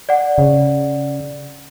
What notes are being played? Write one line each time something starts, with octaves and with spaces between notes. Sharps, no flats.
D5 F#5
C#3